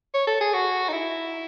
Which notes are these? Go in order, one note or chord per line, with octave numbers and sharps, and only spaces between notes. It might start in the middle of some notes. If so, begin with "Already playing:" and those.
C#5
A4
G#4
F#4
D#4
E4